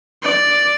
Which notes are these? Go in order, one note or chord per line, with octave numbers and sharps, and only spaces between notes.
D5